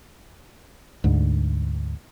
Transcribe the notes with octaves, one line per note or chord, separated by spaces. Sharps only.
D2 G#2